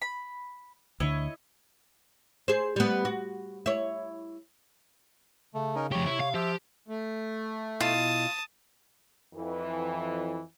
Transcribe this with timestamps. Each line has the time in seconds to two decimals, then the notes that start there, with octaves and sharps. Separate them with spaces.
0.02 B5
1.00 D2 D3 E4 C#5 D#5
2.48 G#4 C5
2.76 G3 B3
3.05 F#4
3.66 E4 C#5
5.54 C#3 A3
5.75 C#4 D#4 A#4
5.92 F2 G4 C#5
6.06 C3 E4
6.20 F5
6.35 F3 G4 E5
6.88 A3
7.80 B2 E4 F4 D#5 A5 D#6
9.35 F2 E3